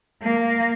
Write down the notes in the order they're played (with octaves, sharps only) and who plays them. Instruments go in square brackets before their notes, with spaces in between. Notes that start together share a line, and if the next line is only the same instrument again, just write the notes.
[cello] A#3